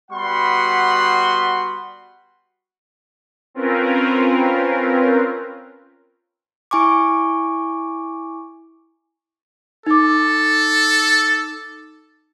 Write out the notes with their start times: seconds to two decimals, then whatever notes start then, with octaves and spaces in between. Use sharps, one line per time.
0.11 G3 B3 F#4 F#5 B5 C6
3.54 C4 C#4 F4 A#4 B4
6.71 E4 G#5 C#6 D6
9.87 D#4 A4 D6